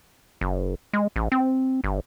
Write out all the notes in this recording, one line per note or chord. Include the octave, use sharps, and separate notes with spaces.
F#1
G#3
A1
C4
G1